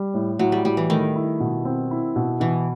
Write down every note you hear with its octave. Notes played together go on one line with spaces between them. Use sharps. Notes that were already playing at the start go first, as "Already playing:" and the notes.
Already playing: G3
A2
A2 F#3
G3
A2 G3
E3
D#3 A3
E4
B2
C4
E4
B2
B2 E3